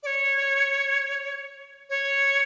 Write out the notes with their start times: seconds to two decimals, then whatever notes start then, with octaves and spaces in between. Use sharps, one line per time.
0.03 D5
0.06 C#5
1.89 C#5